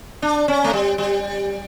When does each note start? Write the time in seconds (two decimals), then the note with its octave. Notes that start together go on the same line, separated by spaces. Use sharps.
0.22 D4
0.48 C#4
0.64 A3
0.73 G3
0.98 G3